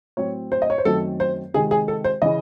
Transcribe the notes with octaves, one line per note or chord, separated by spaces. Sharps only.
A2 F#3 C4 C#5
C5
D#5
C#5
C5
F#2 D#3 F#3 A3 C4 A4
C5
C3 D#3 G#3 C4 G#4
G#4
A4
C5
C#3 E3 D#5